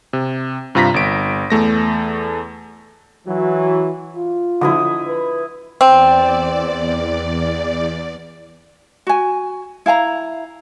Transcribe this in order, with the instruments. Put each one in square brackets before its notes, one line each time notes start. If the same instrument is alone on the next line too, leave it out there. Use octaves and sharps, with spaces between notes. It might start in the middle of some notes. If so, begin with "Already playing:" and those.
[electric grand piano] C3
G2 C3 F4 A#5 A#6 B6
G1 D7
E2 A3 A#6
[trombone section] E3 F#3 [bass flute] F#4
[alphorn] F4
[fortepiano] D3 F3 [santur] E4 D#5 D#6
[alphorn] B4
[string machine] E2 D5 [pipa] C4
[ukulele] F#4 G#5
E4 F5 G#5 A#5